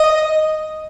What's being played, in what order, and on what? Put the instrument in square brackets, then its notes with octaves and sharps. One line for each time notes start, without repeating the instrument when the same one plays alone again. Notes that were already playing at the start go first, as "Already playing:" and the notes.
Already playing: [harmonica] D#5